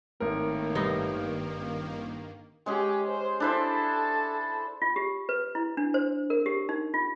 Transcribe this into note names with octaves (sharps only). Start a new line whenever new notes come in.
G#1 A2 D#3 A#3 A#4
G2 D#4
D#1
G#3 C#4 G4 G#4
C5
D4 E4 A4 C5
F4
G4
B4
E4
D4
C5
A#4
G4
D#4
F4